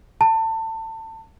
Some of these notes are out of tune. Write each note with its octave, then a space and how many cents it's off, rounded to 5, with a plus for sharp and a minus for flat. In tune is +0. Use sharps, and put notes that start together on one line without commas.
A5 +25